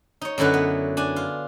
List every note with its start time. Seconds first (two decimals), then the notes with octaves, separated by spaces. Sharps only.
0.21 D#4 C#5
0.38 F#2 D3 F#3 E4 B4
0.54 B3
0.97 D4 G#5
1.16 F4